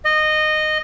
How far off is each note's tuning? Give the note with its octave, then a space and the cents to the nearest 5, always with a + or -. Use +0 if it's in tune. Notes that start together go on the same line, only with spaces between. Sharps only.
D#5 -15